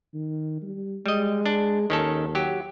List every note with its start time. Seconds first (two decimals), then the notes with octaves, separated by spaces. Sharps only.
0.14 D#3
0.62 G3
1.06 G3 G#3 D#5
1.46 D4
1.90 D#2 D#3 C#4 A4
2.35 F#3 G4